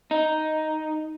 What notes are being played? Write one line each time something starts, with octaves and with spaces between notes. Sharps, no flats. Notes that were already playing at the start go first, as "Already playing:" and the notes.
D#4